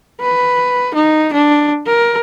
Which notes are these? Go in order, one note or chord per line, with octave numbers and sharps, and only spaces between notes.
B4
D#4
D4
A#4